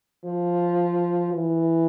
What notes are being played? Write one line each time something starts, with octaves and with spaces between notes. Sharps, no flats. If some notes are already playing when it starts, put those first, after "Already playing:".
F3
E3